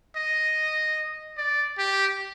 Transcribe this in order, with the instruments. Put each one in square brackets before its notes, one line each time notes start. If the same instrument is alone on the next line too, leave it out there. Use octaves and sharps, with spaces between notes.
[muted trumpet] D#5
D5
G4